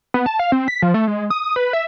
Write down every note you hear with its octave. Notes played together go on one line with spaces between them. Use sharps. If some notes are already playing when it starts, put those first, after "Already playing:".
B3
A5
F5
C4
B6
F3
A3
G#3
D#6
D#6
B4
E5